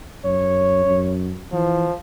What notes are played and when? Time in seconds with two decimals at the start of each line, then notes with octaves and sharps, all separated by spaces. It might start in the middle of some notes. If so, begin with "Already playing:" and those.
0.25 F#2 C#5
0.86 F#2
1.52 E3 F3